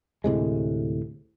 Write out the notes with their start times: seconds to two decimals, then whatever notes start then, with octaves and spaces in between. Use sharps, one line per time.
0.24 D2 A2 C3 G#3